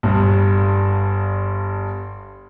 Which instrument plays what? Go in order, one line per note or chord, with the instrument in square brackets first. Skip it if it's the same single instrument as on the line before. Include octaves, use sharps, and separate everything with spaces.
[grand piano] G1 G2